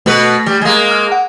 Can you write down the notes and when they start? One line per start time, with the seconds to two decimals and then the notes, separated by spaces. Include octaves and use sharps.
0.06 B2 A3 B4
0.46 G3
0.61 G#3 A#3
0.91 F6
1.12 F#5